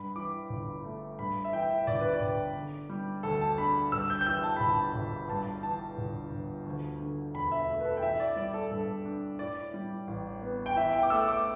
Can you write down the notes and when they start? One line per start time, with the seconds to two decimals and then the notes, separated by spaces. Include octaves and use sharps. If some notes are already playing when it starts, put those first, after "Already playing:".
Already playing: G2 B5
0.15 E3 D6
0.50 G1
0.84 A3
1.19 G2 B5
1.44 E5
1.52 E3 G5
1.70 E5
1.87 G1 D5
2.01 B4
2.14 D5
2.21 G1
2.56 D3
2.90 G3
3.23 D2 A4
3.41 A5
3.58 D4 B5
3.92 G2 E6
4.10 G6
4.21 G6
4.27 E3 E6
4.44 A5
4.56 G1 B5
4.69 A5
4.95 G1
5.29 G2 A5
5.63 E3 A5
5.98 G1
6.31 G1
6.66 D2
7.00 D3
7.34 E1 B5
7.52 E5
7.69 A3
7.81 B4
7.85 A4
7.97 G5
8.02 E3 E5
8.20 D5
8.36 G3 D5
8.54 A4
8.71 G2 A4
9.05 D4
9.39 A2 D5
9.74 G3
10.07 A1
10.42 B3
10.66 G5
10.76 E3 E5
10.93 G5
11.03 D6
11.10 A3 E6
11.28 D6